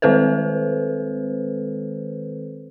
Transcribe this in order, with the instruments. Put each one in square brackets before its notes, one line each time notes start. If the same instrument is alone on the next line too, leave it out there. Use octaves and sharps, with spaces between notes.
[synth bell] D#3 G#3 C4 A4 B4 C5